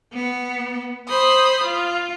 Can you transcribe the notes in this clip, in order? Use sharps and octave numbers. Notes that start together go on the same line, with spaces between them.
B3
C5 B5 C6 D#6
F4